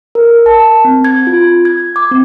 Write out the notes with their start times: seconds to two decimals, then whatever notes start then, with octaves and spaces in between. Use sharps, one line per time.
0.15 A#4
0.46 A5
0.85 C4
1.04 G#6
1.27 F4
1.65 G#6
1.96 D6
2.11 C4